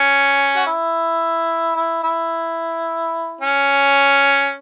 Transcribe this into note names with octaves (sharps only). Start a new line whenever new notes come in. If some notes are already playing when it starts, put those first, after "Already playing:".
Already playing: C#4
F#4
E4
E4
E4
C#4